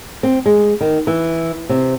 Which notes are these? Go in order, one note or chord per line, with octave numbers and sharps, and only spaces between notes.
C4
G#3
D#3
E3
C3